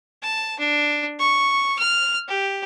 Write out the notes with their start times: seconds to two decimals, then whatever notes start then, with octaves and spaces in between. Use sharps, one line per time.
0.22 A5
0.59 D4
1.19 C#6
1.79 F6
2.28 G4